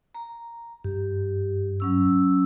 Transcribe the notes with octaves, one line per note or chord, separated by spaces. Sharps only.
A#5
G2 G4
F#3 C#4 E6